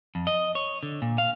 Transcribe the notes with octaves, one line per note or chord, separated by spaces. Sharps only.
F2
D#5
C#5
D3
A#2
F5